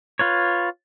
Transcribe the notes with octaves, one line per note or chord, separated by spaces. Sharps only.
F4 B4 C#5